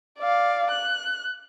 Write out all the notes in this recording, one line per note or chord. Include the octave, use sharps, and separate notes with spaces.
D5 F5
F#6